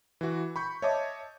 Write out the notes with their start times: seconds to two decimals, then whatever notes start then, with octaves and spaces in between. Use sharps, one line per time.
0.21 E3 F#4
0.56 B5 C#6 G6
0.82 C#5 D#5 E5 A5 D6